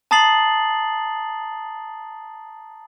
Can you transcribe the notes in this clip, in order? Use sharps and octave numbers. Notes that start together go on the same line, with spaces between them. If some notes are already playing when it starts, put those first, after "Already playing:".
A5 A#5 D#6 A6 C7 F#7